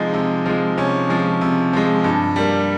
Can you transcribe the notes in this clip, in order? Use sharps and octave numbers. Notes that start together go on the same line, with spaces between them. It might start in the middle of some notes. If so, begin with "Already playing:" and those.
Already playing: C3 F3 G#3 D#4
C3
F3 G#3
C3 C#4
F3 G#3
C3
F3 G#3
G2
G3 A#3